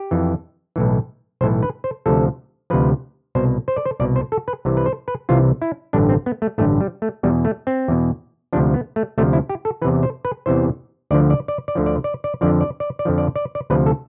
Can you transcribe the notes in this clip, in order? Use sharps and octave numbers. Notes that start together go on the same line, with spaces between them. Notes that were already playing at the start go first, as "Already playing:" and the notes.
Already playing: G4
F2 E3
B1 A2 E3
B1 A2 E3 C5
B4
C5
D2 C3 F3 A4
D2 C3 F3 B4
C2 B2 C5
C5
D5
C5
C2 B2 D5
C5
A4
B4
C2 C3 E3
B4
C5
B4
C2 C3 E3 F4
E4
A1 G2 D3 D4
C4
B3
A3
A1 G2 D3 A3
G3
A3
E2 B2 G3
A3
C4
E2 B2
D2 C3 F3 D4
B3
A3
D2 C3 F3 A3
E4
G4
A4
E2 C3 E3 B4
C5
B4
E2 C3 E3 C5
D2 D3 F3 D5
D5
D5
D5
D2 D3 F3
D5
D5
D5
F2 D3 F3 D5
D5
D5
D5
F2 D3 F3
D5
D5
D5
D2 C3 F3 B4
A4